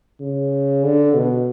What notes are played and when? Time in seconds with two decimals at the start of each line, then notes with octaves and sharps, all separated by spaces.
0.20 C#3
0.84 D3
1.15 B2